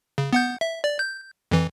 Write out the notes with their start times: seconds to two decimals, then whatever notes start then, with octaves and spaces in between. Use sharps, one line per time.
0.18 C#3
0.33 B3 F#5 G6
0.61 E5
0.84 D5
0.99 G6
1.51 F2 E3